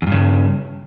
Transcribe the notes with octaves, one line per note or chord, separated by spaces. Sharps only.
E2 G2 C#3